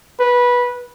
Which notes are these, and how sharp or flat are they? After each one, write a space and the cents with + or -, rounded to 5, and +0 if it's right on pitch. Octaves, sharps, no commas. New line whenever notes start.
B4 -15